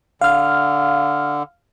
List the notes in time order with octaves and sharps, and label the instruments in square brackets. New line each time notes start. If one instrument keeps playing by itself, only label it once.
[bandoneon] D3 [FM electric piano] F5 F6